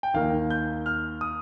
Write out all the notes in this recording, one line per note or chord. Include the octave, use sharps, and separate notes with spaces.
G5
D#2 D#3 A#3 F5
G6
F6
D#6